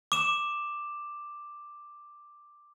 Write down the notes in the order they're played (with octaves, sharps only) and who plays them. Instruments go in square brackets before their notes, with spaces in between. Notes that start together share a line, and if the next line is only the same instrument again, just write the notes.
[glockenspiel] D6 E7